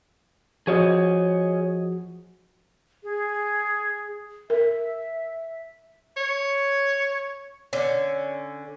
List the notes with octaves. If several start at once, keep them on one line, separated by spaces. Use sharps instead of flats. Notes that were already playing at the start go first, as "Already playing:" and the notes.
F3 F#4 G#4 C#5 D#5
G#4
A#4 E5
C#5
D3 C#4